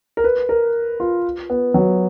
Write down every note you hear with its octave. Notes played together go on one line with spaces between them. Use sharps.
A#4
B4
A#4
F4
B3
F#3